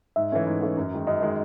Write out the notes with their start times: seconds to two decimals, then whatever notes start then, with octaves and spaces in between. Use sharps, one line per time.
0.16 G#2 E5
0.32 E3 A3 C#4
0.47 G#2
0.61 E3 A3 C#4
0.77 F#2
0.91 D#3 G#3 D#4
1.07 F#2 D#5
1.22 D#3 G#3 D#4